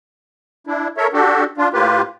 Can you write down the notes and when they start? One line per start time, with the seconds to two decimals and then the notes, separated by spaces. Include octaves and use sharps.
0.67 D4 E4
0.97 A4 A#4 C#5 E5
1.13 D4 F#4 G4 A4
1.58 D4 F4
1.73 A2 A#3 F4 G4 B4